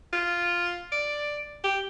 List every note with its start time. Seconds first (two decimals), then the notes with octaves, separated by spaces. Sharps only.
0.13 F4
0.92 D5
1.64 G4